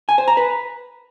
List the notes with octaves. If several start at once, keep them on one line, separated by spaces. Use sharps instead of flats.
G#5
C5
A#5
B4